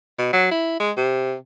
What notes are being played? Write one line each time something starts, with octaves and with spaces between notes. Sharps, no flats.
B2
F#3
E4
G#3
C3